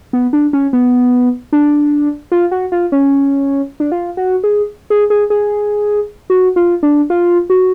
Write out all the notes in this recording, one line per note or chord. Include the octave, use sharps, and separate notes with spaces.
B3
D4
C#4
B3
D4
F4
F#4
F4
C#4
D4
F4
F#4
G#4
G#4
G#4
G#4
F#4
F4
D4
F4
F#4